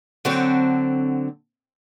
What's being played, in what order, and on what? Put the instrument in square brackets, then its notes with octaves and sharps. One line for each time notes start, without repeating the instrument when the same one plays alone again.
[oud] D3 F#3 C4